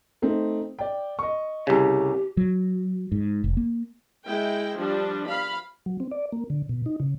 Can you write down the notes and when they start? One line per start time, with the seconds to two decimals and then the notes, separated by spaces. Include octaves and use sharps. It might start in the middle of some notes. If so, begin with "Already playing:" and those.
0.22 A3 C4 D#4
0.79 D5 G5
1.19 D#5 C#6
1.67 C2 C#3 G4
2.37 F#3
3.12 G#2
3.44 F1
3.57 A#3
4.25 G#3 E4 G5
4.78 F3 G3 D4
5.28 F5 B5
5.86 F#3
6.00 C4
6.11 D5
6.32 A#3
6.50 D3
6.69 B2
6.86 D#4
7.00 C#3